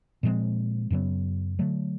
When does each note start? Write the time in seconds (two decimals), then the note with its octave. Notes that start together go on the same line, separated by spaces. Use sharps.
0.23 A#2 F3 G#3 C4
0.91 F#2 C#3 F#3 B3
1.59 D3 F#3 A3